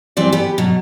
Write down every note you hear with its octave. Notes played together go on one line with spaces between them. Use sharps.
E3 G3 C4 D5
B3 G4
B2 F#3